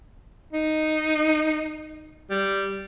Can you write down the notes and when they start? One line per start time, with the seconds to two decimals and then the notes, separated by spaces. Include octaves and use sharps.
0.53 D#4
2.30 G3